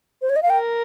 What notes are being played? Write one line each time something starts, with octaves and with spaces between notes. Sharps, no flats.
C5
C#5
D#5
F5
A#4 G5